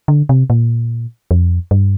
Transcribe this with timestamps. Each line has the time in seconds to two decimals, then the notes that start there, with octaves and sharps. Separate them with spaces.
0.08 D3
0.29 C3
0.50 A#2
1.31 F2
1.71 G2